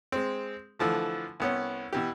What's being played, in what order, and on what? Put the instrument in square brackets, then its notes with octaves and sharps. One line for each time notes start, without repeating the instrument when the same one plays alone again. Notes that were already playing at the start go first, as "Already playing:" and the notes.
[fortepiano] G#3 C4
D3 E3 F3 A3
C2 B3 C#4
B2 E3 G4